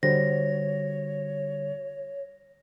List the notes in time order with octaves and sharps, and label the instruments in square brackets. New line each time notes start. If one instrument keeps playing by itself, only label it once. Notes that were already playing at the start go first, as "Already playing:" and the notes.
[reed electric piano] D3 G3 F#4 [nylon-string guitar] C5 [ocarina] C#5 [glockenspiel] A#6